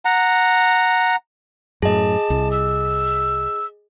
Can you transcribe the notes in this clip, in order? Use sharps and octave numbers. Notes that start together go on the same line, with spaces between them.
F#5 A#5
F#2 A2 G#4 D#5 A5
C2
E6